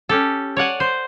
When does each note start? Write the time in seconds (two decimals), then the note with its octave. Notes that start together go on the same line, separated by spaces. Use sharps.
0.09 C#4 G4 A4
0.57 C#5 D5 F#5 G#5
0.80 C5